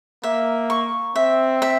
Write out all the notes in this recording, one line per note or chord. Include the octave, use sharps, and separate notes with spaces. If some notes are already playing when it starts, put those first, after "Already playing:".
A#3 E5
C#6
C4 E5
E5